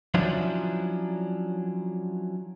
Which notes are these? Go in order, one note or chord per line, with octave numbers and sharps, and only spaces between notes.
F3 F#3 C#4 D4 E4